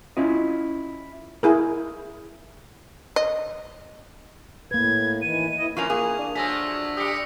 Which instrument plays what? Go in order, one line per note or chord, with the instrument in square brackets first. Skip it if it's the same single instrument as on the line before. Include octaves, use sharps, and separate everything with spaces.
[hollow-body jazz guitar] C#4 E4 F4 D#5
[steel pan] E4 G#4 A#4
[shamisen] D#5
[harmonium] A2 [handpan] A#3 B4 [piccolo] G#6
[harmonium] D#3 E3 [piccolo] D#7
[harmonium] E4 D#5
[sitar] E3 [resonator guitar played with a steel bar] F3 A#3 C#4 [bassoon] F4 [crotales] C#6 F7
[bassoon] A#3 [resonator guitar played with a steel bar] G#4
[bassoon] D4
[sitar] F3 F#3 A3 [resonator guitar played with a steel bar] G#4 [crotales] E6 A#6 B6
[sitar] G3 G4 [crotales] D#6 B6 C#7